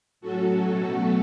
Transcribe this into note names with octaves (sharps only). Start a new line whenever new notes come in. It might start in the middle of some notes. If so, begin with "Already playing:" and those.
A2 F#3 C#4 F#4 A4
B2 F#3 A3 C#4 F#4 A4